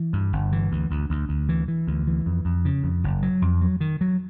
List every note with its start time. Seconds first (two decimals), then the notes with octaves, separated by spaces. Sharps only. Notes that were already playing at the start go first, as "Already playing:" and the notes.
Already playing: E3
0.13 G2
0.33 G1
0.52 E3
0.72 D2
0.91 D2
1.10 D2
1.29 D2
1.49 E3
1.68 E3
1.87 D2
2.07 E3
2.26 F2
2.45 F2
2.65 C#3
2.84 F2
3.04 F#1
3.22 F#3
3.42 F2
3.61 F#3
3.81 D#3
4.01 F#3